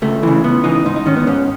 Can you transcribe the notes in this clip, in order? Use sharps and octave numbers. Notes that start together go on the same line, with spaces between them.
C#2 A3
C#3 E3
C#2 B3
C#3 E3 D#4
G#2 D#4
D#4
D#3 C#4
B3
G#2 C#4